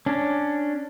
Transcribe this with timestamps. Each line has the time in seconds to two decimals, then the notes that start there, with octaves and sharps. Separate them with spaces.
0.06 C#4 D4